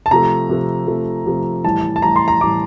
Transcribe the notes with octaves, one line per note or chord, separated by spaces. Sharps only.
A5
C3 F3 A3 A#5
C3 F3 A3
C3 F3 A3
C3 F3 A3
A2 E3 G3 A5
A5
A2 E3 G3 A#5
C6
A#5
A2 E3 G3 D6